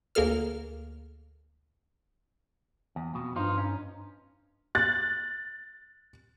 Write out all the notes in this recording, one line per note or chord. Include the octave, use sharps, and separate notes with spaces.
D2 A#3 G#4 A4 F6
E2
F2 B2
G2 F3 D#4 F4
C#4 D#4
F#6 A6